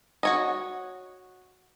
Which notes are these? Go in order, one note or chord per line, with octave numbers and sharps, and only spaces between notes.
F#4 C#5 D#5